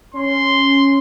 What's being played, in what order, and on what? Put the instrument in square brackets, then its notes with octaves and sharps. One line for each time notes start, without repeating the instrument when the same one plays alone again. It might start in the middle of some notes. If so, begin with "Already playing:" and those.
[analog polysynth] C#4 [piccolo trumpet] C6